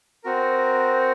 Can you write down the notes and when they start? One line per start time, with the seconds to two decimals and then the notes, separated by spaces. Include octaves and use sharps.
0.24 C4 F#4 A#4